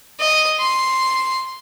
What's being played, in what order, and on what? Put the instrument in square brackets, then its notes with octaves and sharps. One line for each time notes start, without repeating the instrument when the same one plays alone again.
[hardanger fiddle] D#5
C6